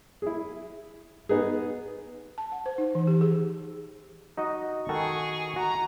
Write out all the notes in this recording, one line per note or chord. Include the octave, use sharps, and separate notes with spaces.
E4 G#4
B3 D#4 G#4
A5
F#5
C5
D#4
E3
G4
G#4
D#4 F#4 D#5
D#3 F#4 G#4 A4 C#6
F#4 A#5